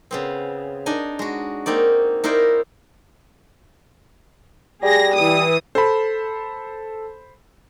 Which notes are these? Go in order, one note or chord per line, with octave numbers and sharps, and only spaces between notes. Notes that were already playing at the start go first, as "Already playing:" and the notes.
C#3 B3 C4
D4 D#4 G#5
G#3 F#4
A#3 C4 D#4 D5
D#4 E4 A#4 C5 D5
G3 G#4 A#6
E3 D#6
A4 C5 B5